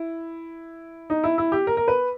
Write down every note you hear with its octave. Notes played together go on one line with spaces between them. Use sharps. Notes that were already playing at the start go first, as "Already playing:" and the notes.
Already playing: E4
D#4
E4
E4
G4
A#4
A#4
B4